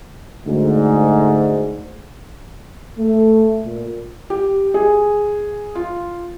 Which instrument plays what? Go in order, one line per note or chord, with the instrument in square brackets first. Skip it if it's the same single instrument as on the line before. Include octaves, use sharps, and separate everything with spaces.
[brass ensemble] D2 G#2
[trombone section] A3
A#2
[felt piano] G4
G#4
F4